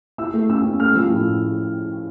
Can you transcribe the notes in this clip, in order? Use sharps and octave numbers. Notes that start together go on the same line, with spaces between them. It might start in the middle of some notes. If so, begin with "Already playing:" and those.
E4 E6
A3
C#4 E6
C#4
A3 F6
F3 E6
A2